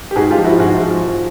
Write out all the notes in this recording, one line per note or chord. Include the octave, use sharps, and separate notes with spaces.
G4
G#2 F#4 G#4
F4 G4
F3
E4 F#4
G#2 F#4 G#4
F3
F3